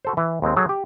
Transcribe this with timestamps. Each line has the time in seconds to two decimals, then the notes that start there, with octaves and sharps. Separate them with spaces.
0.05 F#4 A4 C5
0.17 E3
0.42 D#2 G#3 C4
0.56 F#3 G#4 A4
0.69 G4